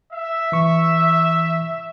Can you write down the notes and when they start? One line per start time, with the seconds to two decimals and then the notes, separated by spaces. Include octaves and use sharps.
0.11 E5
0.52 E3 C#6